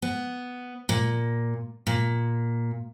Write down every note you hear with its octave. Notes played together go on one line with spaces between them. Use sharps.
B3
A#2
A#2